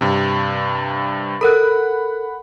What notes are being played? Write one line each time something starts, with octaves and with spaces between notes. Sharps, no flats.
G2 C3
A4 A#4 F#5 B5 F#6